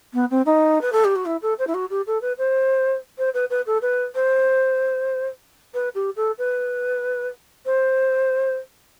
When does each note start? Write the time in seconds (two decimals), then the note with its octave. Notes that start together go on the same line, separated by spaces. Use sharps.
0.14 B3
0.31 C4
0.46 D#4
0.81 B4
0.93 A4
1.05 G4
1.16 F#4
1.26 E4
1.42 A4
1.59 C5
1.67 E4
1.74 F#4
1.90 G4
2.07 A4
2.22 B4
2.38 C5
3.18 C5
3.34 B4
3.50 B4
3.67 A4
3.82 B4
4.15 C5
5.74 B4
5.95 G4
6.16 A4
6.38 B4
7.66 C5